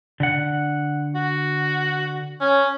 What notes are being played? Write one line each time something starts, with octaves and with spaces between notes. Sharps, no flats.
D3 F#5
F#4
C#4